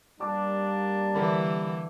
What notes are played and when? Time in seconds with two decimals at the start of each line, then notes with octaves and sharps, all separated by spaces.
0.20 G3 A#3 D4 A5 D6
1.14 D3 E3 A#4 B5